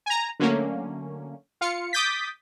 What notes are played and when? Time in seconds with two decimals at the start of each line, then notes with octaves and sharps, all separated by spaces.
0.06 G#5 A#5
0.40 D3 F#3 A3 A#3 C#4
1.61 F4 F5 C#7
1.93 D6 D#6 G6 A6 B6